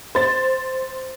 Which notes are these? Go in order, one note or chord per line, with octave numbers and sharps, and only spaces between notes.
C5 A6